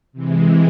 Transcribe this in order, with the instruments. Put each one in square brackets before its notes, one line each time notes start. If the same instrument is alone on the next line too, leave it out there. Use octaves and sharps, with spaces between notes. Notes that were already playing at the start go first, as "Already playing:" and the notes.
[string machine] C3 E3 G#3